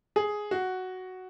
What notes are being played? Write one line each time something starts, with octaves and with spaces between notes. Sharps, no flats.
G#4
F#4